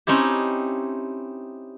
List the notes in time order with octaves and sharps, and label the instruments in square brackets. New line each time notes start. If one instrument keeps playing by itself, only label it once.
[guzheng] C4 C#4 D#4 E4 G4